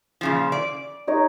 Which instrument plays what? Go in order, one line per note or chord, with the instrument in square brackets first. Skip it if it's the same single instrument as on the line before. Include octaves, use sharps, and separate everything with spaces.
[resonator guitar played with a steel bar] A#2 C#3 F3
D5
[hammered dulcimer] D#4 C#5 D#5